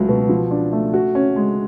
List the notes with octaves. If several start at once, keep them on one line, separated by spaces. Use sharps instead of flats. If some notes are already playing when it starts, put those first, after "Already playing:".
Already playing: C#2 F#3 A3
B2
F3
D4
A3
F#4
C#4
G#3